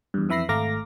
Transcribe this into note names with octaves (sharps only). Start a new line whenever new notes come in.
E2 G2
F2 E3 E5 B5 A#6 C7
G#1 A3 F5 A#5 D6 A#6